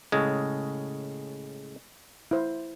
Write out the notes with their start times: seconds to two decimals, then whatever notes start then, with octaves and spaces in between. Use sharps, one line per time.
0.12 A2 C#3 G#3
2.31 E4 C5